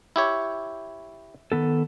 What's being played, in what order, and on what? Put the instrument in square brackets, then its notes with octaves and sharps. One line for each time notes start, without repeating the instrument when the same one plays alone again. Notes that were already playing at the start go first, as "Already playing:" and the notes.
[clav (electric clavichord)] E4 G4 C#5
[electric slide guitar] D#3 B3 A4